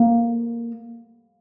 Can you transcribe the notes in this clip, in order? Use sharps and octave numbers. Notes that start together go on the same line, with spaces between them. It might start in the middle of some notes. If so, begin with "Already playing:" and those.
Already playing: A#3